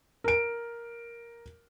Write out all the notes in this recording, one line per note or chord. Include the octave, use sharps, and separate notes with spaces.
A#4 D7